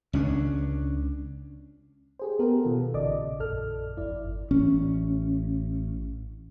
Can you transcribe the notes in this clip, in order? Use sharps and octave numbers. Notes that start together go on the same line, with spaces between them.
C#2 C#4 D4
G4 G#4 C5
B3 G4 A4 A#4
B2 D#3 F4 A4
A#1 C#3 D5 D#5 D6
A#1 F#2 A4 F6
G1 F2 E4 D5
A1 C#4